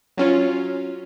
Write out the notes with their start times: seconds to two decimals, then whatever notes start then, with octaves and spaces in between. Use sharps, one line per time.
0.18 F#3 C#4 F4